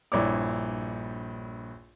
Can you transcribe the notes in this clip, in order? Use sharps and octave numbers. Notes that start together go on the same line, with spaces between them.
A#1 G2 E4 C#5 D5 D6